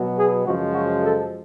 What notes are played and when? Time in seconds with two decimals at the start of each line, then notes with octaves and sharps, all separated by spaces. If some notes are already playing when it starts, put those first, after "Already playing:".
Already playing: B2 F#3 B3
0.16 G#4
0.44 F#2 C#3 F3 G#3 F#4
0.73 F#4
1.02 A4